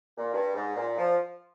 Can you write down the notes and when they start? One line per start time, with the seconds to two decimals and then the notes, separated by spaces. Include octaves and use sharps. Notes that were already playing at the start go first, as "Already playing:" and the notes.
0.17 A#2
0.34 G2
0.55 G#2
0.76 A#2
0.98 F3